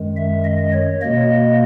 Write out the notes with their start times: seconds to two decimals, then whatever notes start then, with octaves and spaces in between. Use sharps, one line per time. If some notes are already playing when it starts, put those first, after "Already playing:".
Already playing: F#2 D#3 G#3
0.16 E5
0.44 D#5
0.73 C#5
1.01 B2 A#3 D#5